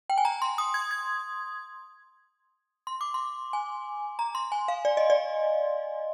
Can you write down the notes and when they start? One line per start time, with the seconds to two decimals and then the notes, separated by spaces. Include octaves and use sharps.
0.10 G5
0.18 G#5
0.25 A#5
0.42 C6
0.58 D#6
0.74 G#6
0.91 G#6
2.87 C6
3.01 D6
3.14 C6
3.53 G#5
4.19 A#5
4.35 C6
4.52 G#5
4.68 F5
4.85 D5
4.97 D#5
5.10 D5